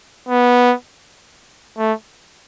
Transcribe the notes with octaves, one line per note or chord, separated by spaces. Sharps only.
B3
A3